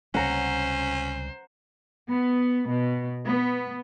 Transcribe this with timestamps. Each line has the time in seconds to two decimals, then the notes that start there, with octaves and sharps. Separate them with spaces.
0.15 C#2 C3 G3 C#4 C5 F#5 A#5
2.09 B3
2.67 B2
3.25 B3